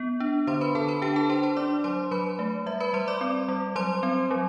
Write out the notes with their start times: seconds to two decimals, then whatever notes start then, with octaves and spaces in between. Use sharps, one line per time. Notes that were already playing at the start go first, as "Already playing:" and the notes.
Already playing: B3
0.20 D4
0.47 D3 C5 C6
0.61 B4 B5
0.75 D3 A4 A5
0.88 B4 B5
1.02 D4 G4 G5
1.16 A4 A5
1.29 D4 C5 C6
1.43 C5 C6
1.57 D4 D5 D6
1.84 F#3 C5 C6
2.11 F#3 B4 B5
2.39 A3
2.66 G3 E5
2.80 B4 B5
2.93 G3 C5 C6
3.08 D5 D6
3.21 C4
3.48 G3
3.76 F#3 C5 C6
4.03 C4
4.31 F#3